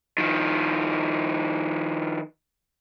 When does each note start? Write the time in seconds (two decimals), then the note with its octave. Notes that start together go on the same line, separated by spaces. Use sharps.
0.18 D#3 F3